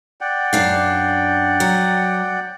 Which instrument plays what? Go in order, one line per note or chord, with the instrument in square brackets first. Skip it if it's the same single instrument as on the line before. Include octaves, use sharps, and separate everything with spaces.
[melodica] D5 F#5 G5
[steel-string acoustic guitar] F#2 D4 F5
F#3